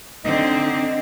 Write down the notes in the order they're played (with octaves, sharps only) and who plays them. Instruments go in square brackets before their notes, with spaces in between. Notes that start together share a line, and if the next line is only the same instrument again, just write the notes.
[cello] D3 C4 [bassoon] D#4